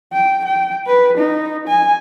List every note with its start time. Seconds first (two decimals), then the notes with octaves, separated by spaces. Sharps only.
0.13 G5
0.45 G5
0.87 B4
1.18 D#4
1.68 G#5